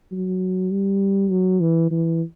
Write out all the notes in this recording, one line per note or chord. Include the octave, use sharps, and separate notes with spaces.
F#3
G3
F#3
E3
E3